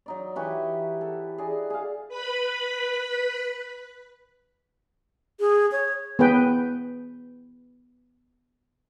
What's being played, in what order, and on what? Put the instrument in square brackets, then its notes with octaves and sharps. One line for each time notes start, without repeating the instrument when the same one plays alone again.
[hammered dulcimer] F#3 D#4 D5
E3 F#4 G4
A4
G#4 D5 D#5
G#4 F5
[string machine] B4 B5
[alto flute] G#4
C#5
[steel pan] B3 G#4 B4 G5